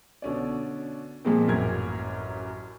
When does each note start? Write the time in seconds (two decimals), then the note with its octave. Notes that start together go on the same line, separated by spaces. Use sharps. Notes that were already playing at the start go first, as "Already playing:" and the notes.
0.22 B2 D3 C#4 D5
1.25 A#2 F3 G#3 A#3 C4
1.48 A1 F#2 A#4 G#6